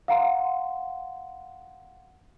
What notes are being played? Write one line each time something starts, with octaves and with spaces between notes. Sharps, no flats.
F5 F#5 A#5 C6